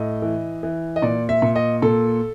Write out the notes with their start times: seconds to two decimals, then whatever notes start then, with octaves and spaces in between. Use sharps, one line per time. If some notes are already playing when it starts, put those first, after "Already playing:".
Already playing: A2 D#5
0.22 E3
0.63 E3
0.96 D#5
1.02 A#2 D5
1.29 E5
1.42 A#2
1.56 D#5
1.82 A#2 A4